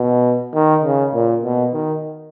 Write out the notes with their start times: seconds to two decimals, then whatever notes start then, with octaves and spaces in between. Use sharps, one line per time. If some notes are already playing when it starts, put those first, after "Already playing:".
Already playing: B2
0.54 D#3
0.84 C#3
1.14 A#2
1.43 B2
1.73 D#3